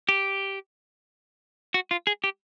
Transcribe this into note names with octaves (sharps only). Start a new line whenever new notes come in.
G4
F#4
F4
G#4
G4